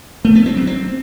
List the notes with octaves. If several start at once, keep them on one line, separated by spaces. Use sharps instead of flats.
A3
B3
C4
F#3
C4